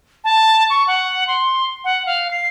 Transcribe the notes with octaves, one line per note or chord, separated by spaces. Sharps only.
A5
C#6
F#5
C6
F#5
F5
C7